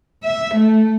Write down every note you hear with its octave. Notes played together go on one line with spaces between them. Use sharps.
E5
A3